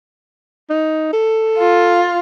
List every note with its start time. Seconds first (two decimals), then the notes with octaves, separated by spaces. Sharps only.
0.70 D#4
1.13 A4
1.58 F4